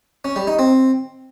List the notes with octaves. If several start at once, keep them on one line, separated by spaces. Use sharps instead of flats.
C#4
G3
D#4
C4